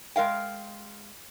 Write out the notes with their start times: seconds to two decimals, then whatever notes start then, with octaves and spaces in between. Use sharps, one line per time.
0.16 G#3 A#4 F5 G5